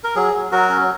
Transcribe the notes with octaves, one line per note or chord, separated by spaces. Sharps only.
A#4
F#3 G#4
F#3
F#3 F#4 A#4
C#4